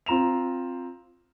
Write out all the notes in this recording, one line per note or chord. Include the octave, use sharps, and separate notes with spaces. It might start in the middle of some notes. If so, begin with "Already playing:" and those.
C4 F4 A#5 E7 F7